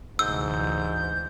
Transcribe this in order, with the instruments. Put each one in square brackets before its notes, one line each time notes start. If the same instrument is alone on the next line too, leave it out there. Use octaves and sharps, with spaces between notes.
[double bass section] D2 C3 E3 [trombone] G#2 [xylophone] E6 [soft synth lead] G6